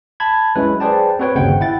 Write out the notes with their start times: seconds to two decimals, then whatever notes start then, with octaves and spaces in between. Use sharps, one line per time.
0.20 A5 B5 G#6
0.55 F#3 G#3 C#4 E4 B4
0.80 G#4 B4 C5 D5 G5 A5
1.19 C4 F#4 B4 C#5 G5
1.35 G1 D#2 C#3 C5 F#5 G5
1.61 E4 F#5 G5 A6